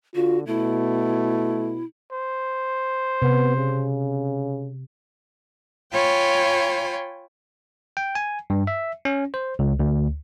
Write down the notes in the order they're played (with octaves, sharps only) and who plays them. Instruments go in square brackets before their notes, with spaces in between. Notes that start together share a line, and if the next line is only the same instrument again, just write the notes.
[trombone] D3 [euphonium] F4 [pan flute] F#4
[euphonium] B2 [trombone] A3 [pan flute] E4
[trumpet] C5
[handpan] C3 [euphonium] B3
[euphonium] C#3
[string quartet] F4 C#5 G5 G#5 B5
[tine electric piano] G5
G#5
G2
E5
C#4
C5
C#2
D2